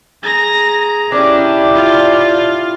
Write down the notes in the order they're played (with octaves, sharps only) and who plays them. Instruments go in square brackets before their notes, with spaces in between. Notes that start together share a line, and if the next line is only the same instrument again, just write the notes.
[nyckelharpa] G#4 A#5 [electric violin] A#6
[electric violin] C#4 [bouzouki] D4 [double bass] E4 [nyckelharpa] G4 D5
[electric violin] F4